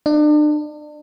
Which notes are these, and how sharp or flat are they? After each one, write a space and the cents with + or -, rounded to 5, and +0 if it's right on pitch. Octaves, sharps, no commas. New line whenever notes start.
D4 +35